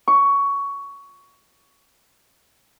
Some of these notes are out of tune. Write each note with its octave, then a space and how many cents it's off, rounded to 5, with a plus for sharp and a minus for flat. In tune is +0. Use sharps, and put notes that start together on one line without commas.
C#6 +15